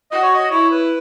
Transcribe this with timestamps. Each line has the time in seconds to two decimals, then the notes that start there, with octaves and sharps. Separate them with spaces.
0.11 F#4 D#5
0.22 C#5
0.34 D#5
0.50 E4 C#5
0.71 B4